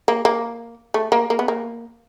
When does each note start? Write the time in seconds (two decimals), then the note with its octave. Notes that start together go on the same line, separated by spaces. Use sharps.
0.08 A#3
0.25 A#3
0.94 A3
1.12 A#3
1.30 A#3
1.39 B3
1.48 A#3